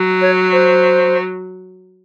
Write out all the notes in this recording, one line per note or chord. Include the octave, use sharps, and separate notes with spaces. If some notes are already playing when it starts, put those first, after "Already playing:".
Already playing: F#3
C#5
C5